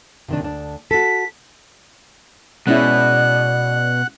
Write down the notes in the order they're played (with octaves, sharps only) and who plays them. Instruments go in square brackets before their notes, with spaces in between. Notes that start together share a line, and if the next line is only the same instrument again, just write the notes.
[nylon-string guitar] C3 D#3 D4
D2 D4
[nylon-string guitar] F#4 A4 [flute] B6
[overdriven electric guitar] B2 [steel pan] G#3 C#4 E4 [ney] D5 [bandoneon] F#5 F#6